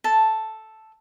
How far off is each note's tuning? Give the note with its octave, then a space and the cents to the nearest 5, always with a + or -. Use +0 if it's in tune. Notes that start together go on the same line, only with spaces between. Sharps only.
A4 +0 A5 +0